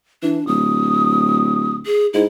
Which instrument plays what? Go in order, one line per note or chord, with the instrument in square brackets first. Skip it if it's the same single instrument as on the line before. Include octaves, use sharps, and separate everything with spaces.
[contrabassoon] E3 [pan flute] D4
[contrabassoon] D1 [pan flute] D#6
[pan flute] G#4
[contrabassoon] G#2 [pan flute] E4